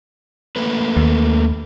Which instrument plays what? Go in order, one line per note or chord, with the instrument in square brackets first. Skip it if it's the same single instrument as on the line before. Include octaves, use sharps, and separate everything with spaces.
[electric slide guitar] A3 A#3 B4
[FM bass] D#2